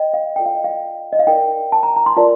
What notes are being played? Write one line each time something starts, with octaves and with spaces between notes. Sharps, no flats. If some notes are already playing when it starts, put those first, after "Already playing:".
Already playing: D#5 G5
F5
F4 A4 D5 G5
F5
D#5
F5
D#5
F5
D#4 A#4 D5 G5
A5
A#5
A#5
C6
F4 A#4 D5 A5